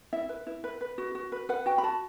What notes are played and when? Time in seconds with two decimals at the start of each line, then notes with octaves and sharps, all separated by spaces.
0.13 E4 E5
0.29 B4
0.47 E4
0.64 B4
0.81 B4
0.98 F#4
1.15 F#4
1.32 B4
1.49 B4 F#5
1.66 F#4 G5
1.78 B5
1.83 F#4 A5